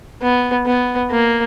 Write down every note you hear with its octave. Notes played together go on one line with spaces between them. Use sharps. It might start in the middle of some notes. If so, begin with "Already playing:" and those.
B3
B3
A#3